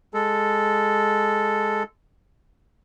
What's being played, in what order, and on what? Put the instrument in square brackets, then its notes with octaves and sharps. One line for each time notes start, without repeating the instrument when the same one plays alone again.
[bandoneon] G#3 A4